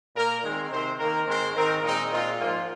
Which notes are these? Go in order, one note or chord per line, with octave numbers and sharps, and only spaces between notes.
A#2 A#3 A#4
D#3 G#3 C4
C3 D#3 C4 C5
D#3 A#3 A#4
G#2 D#3 G#3 C4 C5
D#3 C4 A#4
A#2 G#3 C4 D#4
A#2 G#3 C4 F4
G#2 F3 A#3 F4